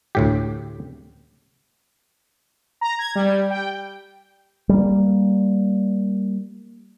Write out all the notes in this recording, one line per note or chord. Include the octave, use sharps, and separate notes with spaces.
D2 A2 G4
A#5
G#6
G3
G5
G3 A#3